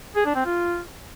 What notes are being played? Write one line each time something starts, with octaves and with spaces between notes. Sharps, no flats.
G#4
D4
C4
F4